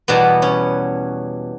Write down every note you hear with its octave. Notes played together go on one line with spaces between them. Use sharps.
E2 B2 G3 B3
C#4